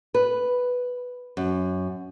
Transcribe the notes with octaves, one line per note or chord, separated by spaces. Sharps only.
B4
F#2